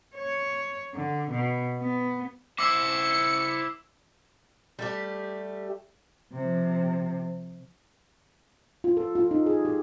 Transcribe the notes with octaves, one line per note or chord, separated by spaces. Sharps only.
C#5
D3
B2
B3
E4 C5 D6 E6 C#7
G3 A3 G4
C3 F3
F4
A4
F4
D#4
G#4
G4